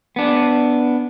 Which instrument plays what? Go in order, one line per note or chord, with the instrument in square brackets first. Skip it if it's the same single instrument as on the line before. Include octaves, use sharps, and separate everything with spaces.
[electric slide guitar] B3 D4